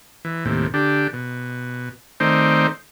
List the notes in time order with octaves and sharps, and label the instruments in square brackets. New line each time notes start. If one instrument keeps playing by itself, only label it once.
[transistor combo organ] E3
D#2 A2 C3
D3 D4 G4
B2
D#3 A3 C4 D#4 C5 D5